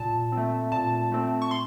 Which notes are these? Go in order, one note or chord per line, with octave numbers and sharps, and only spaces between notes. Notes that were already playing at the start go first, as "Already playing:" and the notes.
Already playing: A#2 A5
C4
A3
A#2 A5
A3 C4
C#6
C6